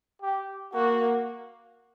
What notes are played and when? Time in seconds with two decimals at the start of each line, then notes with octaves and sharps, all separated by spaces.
0.22 G4
0.74 A#3 F#4